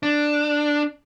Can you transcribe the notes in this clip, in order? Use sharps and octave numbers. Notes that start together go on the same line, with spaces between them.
D4